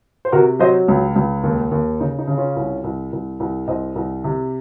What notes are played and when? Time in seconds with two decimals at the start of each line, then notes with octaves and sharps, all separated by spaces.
0.25 C5
0.32 C3 F#4 A#4
0.59 F#3 C5 D#5
0.88 C#2
1.16 C#2
1.43 D#2
1.71 D#2
2.00 C#3 D#4
2.19 D#4
2.27 C#3
2.38 C#4 F4
2.56 C2
2.84 C2
3.13 C2
3.40 C2
3.68 C2 C5 D#5
3.96 C2
4.24 C3